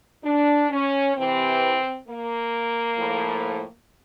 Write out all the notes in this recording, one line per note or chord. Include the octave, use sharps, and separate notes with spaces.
D4
C#4
C3 E3 C4
A#3
A2 F3